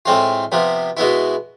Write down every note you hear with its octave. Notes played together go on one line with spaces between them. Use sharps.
A2 G#3 C4 F4
C3 F3 B3
B2 G#3 B3 E4